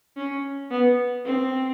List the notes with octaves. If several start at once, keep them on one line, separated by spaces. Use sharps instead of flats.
C#4
B3
C4